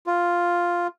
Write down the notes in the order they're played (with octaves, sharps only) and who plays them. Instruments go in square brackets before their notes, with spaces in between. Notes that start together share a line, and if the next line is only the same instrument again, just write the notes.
[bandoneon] F4